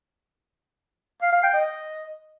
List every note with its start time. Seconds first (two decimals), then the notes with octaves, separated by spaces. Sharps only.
1.22 F5
1.33 F5
1.43 G5
1.54 D#5